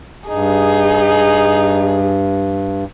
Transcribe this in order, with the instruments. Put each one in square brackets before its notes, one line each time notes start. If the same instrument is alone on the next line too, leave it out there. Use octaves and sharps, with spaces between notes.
[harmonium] G2 [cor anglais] D#4 [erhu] G#4